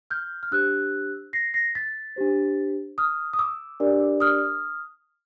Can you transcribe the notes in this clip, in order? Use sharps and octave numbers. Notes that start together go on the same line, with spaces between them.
F6 G6
F6
D4 G4 C5 E6 F#6
A#6 C7
A#6 C7
A6 B6
D4 G4 C5
D#6 F6
D#6
D6 E6
D4 G4 A#4 D5
D#6 F6